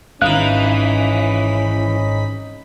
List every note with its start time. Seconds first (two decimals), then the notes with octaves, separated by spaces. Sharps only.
0.22 G#1 E3 C#4 D#4 F5 B5 F#6